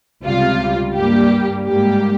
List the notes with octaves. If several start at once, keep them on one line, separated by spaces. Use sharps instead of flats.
C#2 C3 G3 F4
G2 G3 A#3 G4
G#2 G3 A#3 G4